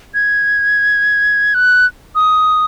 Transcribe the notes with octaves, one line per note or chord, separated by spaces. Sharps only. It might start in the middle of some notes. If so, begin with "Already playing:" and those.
G#6
F#6
D#6